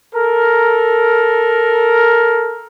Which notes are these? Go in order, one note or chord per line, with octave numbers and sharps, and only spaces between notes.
A4 A#4